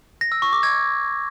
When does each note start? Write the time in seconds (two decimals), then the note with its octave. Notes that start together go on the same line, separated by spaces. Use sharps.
0.21 A#6
0.32 E6
0.42 C#6
0.53 D6
0.63 G#6